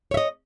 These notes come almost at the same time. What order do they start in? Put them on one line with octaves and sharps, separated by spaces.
C#5 E5 D#5